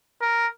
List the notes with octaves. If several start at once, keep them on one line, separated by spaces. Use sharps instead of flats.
A#4